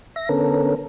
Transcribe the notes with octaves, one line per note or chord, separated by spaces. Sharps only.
E5 A#6
D3 B3 C#4 A4 A#4